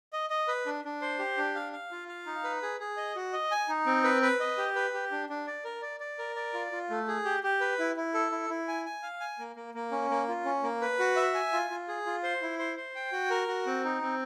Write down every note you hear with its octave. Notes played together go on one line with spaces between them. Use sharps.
D#5
D#5
B4
D4
D4
C5
G4
D4
F5
F5
F4
F5
D#4
B4
G#4
G#4
D#5
F#4
D#5
G#5
D#4
C4
B4
B4
D#5
G4
B4
G4
D4
D4
D5
A#4
D5
D5
A#4
D5
F4
F4
A3
G#4
G4
G4
B4
E4
E4
A4
E4
E4
G#5
G#5
F5
G#5
A#3
A#3
A#3
C#4
A#3
F4
C#4
A#3
B4
F#4
E5
G#5
F4
F4
G#4
F4
C5
E4
C5
C5
G5
F#4
A#4
F#4
C4
D#4
C4